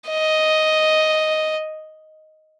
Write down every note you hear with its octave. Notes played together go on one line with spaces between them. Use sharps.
D#5